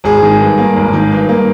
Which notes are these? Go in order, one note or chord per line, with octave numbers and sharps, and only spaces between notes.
G#1 G#4
D#3
G2
A#3
G#1
D#3
G2
A#3